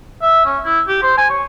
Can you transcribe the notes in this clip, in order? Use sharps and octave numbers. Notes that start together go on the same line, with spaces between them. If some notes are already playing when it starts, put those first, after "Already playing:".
E5
C#4
E4
G4
C5
G#5
C#5